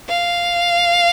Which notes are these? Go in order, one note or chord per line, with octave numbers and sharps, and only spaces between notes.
F5